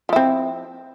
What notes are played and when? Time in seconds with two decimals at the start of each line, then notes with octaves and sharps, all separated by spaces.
0.09 F3
0.13 E4
0.16 C4